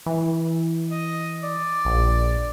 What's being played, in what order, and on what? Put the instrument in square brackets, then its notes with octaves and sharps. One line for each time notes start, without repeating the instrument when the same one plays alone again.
[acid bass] E3
[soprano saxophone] D#5
D5
[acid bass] A#1